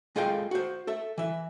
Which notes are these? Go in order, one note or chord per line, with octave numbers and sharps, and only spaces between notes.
G#3 F4 G#4 A4 F5 G5
F#4 C5
A4 E5
E3 E5